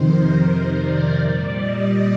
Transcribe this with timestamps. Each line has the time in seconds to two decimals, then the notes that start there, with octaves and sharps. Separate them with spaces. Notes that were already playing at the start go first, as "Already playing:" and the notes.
Already playing: F2 C3 D#3 A#4 C5
0.34 C5
0.74 D5
1.14 A#2 G3 D5
1.56 D#5